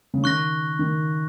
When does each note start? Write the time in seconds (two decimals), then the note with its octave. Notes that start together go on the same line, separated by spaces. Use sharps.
0.14 C#3
0.23 D#3 C#6 F#6 A#6
0.79 D#3